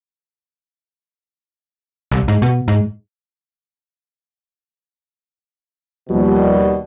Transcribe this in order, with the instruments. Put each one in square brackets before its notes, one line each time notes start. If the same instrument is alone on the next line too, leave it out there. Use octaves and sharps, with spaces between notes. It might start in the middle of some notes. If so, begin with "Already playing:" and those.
[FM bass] C2
G#2
B2
G#2
[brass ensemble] D#2 B2 G3 [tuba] F3